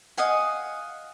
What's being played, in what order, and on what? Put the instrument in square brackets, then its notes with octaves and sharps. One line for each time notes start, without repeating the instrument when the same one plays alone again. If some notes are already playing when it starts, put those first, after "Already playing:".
[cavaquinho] D#5 F5 F#5 G#5